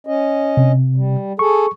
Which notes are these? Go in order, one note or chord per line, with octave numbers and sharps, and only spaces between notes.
C#4 D#5
C3
G3
G#4 A4 C#6